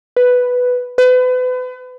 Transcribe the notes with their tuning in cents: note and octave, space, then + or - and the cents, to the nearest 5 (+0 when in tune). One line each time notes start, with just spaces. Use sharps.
B4 +5
B4 +35